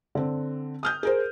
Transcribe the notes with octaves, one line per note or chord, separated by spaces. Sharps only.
D3 C4
D#6 F6 G6
G#4 A#4 C5